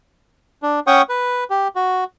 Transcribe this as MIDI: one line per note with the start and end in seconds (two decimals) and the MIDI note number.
0.63 0.80 62
0.87 1.02 61
0.87 1.02 73
0.87 1.02 78
0.87 1.02 79
0.87 1.02 85
0.87 1.02 87
1.09 1.44 71
1.50 1.68 67
1.76 2.04 66